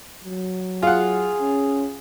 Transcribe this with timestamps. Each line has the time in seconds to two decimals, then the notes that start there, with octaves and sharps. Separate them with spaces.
0.24 F#3
0.83 F4 G#4 F#5
1.41 C#4